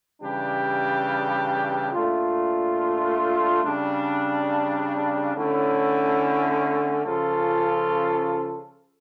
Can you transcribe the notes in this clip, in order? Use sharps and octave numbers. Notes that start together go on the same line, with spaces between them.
C#3 E3 G3 D4 G4
A#2 A3 D4 F4
C#3 G3 D4
D3 A3 C#4 E4
C#3 F3 C#4 F4 A4